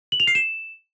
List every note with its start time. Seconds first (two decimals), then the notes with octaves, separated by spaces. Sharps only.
0.12 F#7
0.20 F7
0.27 C7
0.35 E7